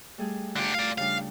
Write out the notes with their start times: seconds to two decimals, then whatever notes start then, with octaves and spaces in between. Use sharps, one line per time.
0.18 G3 A3 G#4
0.56 D3 F4 G4
0.75 D5 F5
0.98 C#3 G3 D4 F5